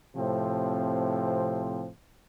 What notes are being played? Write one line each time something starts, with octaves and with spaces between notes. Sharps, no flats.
A2 C3 F3 C4